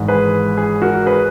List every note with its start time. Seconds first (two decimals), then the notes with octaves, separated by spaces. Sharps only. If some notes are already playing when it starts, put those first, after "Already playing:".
Already playing: G#1 G#2 E3
0.08 G#4 B4
0.57 G#4
0.82 F#4 A#4
1.06 G#4 B4